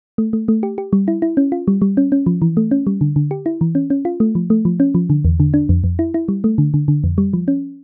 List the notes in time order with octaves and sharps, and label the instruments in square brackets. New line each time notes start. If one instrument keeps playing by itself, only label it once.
[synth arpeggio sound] A3
A3
A3
G4
G4
G3
E4
E4
C#4
F4
G3
G3
C#4
C#4
F3
E3
A3
C#4
G3
D3
D3
G4
E4
E3
C#4
C#4
F4
A3
F3
A3
F3
C#4
F3
D3
E2
D3
D4
F2
F2
E4
E4
G3
A3
D3
D3
D3
F2
G3
F3
C#4